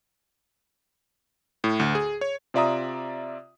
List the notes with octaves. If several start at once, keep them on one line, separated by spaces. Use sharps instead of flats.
A2
D2
G#4
C#5
C3 F4 D5 E5 A#5 D#6